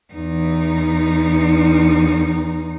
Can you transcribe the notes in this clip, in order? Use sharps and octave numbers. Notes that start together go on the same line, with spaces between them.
E2 D#4